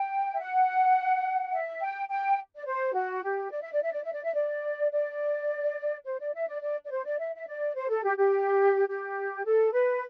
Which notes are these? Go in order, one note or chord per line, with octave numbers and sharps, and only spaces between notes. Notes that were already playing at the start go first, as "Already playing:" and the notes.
Already playing: G5
E5
F#5
E5
G5
G5
D5
C5
F#4
G4
D5
E5
D5
E5
D5
E5
D5
E5
D5
D5
C5
D5
E5
D5
D5
D5
C5
D5
E5
E5
D5
C5
A4
G4
G4
G4
A4
B4